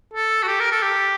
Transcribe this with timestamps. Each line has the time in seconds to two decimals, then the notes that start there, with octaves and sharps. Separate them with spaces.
0.14 A4
0.43 F#4
0.47 G4
0.60 A#4
0.71 A4
0.83 G4